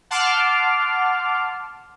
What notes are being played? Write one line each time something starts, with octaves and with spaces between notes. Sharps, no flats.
F#5 A5 C6 D6 F6